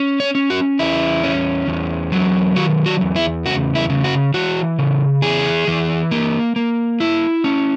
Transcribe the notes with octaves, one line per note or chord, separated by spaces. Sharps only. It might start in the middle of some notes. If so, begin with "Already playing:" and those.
Already playing: C#4
C#5
C#4
F#4
E2 E4
C#4
E2
F#3
D#3 F#4
F#4
E2
E4
C#3 F#4
E4
C#3
F#4
E3 F#4
C#3
E3 G#4
E3
A#3
A#3
E4
C#4